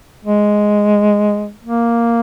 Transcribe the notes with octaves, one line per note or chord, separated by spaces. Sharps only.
G#3
A#3